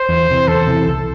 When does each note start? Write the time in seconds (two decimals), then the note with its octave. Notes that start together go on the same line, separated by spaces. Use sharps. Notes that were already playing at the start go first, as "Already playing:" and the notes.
Already playing: C5
0.09 E2
0.28 C3 E3
0.47 E2 A4
0.67 C3 E3
0.87 C2